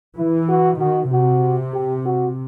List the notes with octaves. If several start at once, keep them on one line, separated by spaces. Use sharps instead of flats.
E3 E4
F#4
D#3 F#4
C3 F#4
G4
F#4